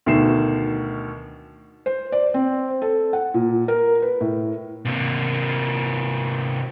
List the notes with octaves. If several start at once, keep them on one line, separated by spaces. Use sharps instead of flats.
D2 B2 D#3 C7 E7
C5
D5
C4
A4
F#5
A#2
A#4
B4
A2
C3 A#3